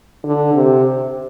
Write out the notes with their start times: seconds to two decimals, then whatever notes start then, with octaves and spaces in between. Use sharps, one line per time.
0.24 D3
0.54 C3